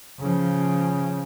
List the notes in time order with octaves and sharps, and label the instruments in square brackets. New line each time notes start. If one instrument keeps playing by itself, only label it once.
[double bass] C#3 F3